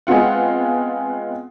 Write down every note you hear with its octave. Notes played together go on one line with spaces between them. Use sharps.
G#3 B3 C4 F4 F#5